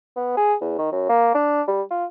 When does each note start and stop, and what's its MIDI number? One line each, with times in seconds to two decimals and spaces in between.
0.16 0.35 59
0.37 0.54 68
0.61 0.74 40
0.79 0.90 51
0.92 1.09 42
1.09 1.32 58
1.35 1.62 62
1.68 1.82 55
1.91 2.05 65